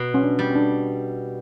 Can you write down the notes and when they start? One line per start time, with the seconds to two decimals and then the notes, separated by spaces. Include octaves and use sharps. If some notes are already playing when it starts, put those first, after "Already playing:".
Already playing: B2
0.14 C#4
0.23 D4
0.39 G3
0.50 C#4
0.55 D4